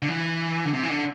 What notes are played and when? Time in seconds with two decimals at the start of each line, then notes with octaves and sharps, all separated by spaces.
0.02 D3
0.08 E3
0.65 D3
0.73 C3
0.83 E3
0.90 D3